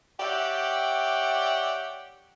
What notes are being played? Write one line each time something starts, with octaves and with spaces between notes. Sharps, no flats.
G4 C#5 D5 E5 F#5 G5